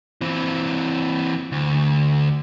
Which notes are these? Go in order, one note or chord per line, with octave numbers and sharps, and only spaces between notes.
E3 C4
D2